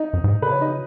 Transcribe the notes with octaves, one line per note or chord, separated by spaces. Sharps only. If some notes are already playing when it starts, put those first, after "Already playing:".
Already playing: D#4 D#5
F#2
G#2
A2
C#3 B4
C#5
D#4 D#5